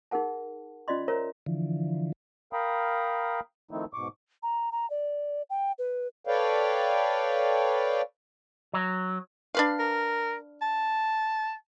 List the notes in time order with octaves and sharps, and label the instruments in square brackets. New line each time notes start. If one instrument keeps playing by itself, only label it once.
[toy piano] D#4 G#4 A#4 F#5 A5
C#4 F4 D5 D#5 C6
A#4 C5 C#5 E5 A#5
[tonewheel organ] D3 E3 F3
[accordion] A#4 F5 G5 A#5 B5 D#6
D#3 F3 A3 C4 D#4 E4
G#2 B2 C#6 D6
[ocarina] A#5
A#5
D5
G5
B4
[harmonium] A4 B4 C#5 D5 F5 G5
[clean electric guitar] F#3
[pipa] D4 B4 F5
[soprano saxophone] A#4
A5